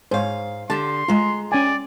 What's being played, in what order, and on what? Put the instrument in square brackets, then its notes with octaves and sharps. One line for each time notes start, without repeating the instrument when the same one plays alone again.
[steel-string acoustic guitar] G#2 F5 [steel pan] C5 C#5
[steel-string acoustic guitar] D3 G4 [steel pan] A5 [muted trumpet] C6
[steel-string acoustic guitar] G#3 A#5 [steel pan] F4 F5
[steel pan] C#4 G5 G#5 [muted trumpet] D5